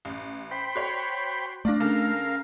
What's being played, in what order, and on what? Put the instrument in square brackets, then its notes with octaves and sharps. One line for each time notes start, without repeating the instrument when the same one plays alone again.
[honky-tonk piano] A1
[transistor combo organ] C5 G5 B5
[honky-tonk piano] F#4 C#5
[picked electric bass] A3 D4 [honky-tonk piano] D5 F5 A#6
[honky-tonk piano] C#3 A4 [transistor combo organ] A#4 F5